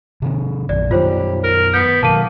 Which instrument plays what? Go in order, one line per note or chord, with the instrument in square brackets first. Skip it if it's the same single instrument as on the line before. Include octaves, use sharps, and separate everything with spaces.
[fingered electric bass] C3 D#3 C4
[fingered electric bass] A#1 F#2 A#2 [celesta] D5
[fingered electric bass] F#2 D#3 [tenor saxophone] G3 [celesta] F4 C5 C#5
[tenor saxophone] A#4
[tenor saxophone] B3 [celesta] G6
[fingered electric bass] B2 D#3 F#3 [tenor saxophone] A#3 [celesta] A5 D#7